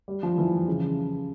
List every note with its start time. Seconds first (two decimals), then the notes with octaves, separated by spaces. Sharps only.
0.08 G3
0.23 F3
0.38 E3
0.68 C#3